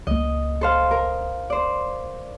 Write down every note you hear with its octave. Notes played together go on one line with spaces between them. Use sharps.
C#2 A#3 D#5
A4 C5 F5
A#4
C5 D5